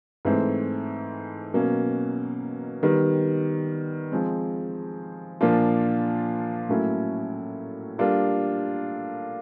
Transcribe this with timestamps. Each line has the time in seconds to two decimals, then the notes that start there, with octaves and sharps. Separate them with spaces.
0.25 G#2 E3 A3 C4
1.54 B2 F#3 A#3 C#4
2.83 D#3 G3 B3
4.12 F3 G#3 C4
5.41 A#2 F3 A#3 D4 F4
6.69 A2 F#3 A#3 C#4 E4
7.98 G3 A#3 D4 F4 A4